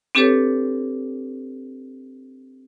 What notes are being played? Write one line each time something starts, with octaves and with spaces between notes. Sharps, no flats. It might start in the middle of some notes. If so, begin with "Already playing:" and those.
C4 D4 G4 A4 B4 C#5